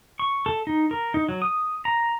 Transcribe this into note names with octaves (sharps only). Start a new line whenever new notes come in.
C#6
A4
D#4
A#4
D#4
F#3
D#6
A#5